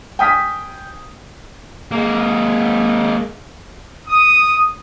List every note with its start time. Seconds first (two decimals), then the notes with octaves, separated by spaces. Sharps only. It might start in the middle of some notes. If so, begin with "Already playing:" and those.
0.19 G5 G#5 D#6 F6 B6
1.91 G#3 A#3
4.08 D#6